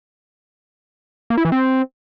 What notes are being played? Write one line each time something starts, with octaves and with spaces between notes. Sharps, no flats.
A#3
E4
E3
C4